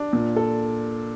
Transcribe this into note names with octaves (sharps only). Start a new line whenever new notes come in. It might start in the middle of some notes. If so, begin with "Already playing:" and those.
Already playing: D4
A#2
A4